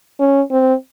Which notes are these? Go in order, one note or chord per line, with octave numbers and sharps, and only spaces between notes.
C#4
C4